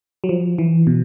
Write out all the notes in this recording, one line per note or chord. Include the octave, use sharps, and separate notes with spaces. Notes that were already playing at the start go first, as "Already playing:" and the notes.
F#3
F3
E3
B2